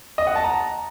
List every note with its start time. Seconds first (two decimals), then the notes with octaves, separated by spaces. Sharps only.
0.18 D#5
0.27 F#5
0.35 A5
0.44 A#5